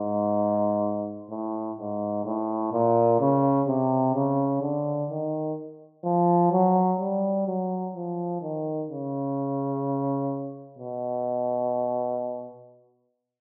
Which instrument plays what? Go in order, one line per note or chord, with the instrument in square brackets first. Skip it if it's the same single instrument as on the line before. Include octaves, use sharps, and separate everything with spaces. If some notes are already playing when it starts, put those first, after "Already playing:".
Already playing: [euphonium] G#2
A2
G#2
A2
A#2
C#3
C3
C#3
D3
D#3
F3
F#3
G3
F#3
F3
D#3
C#3
B2